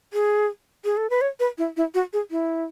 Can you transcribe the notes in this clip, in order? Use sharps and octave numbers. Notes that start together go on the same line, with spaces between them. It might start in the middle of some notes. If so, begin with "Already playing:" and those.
G#4
G#4
A4
B4
C#5
B4
E4
E4
F#4
G#4
E4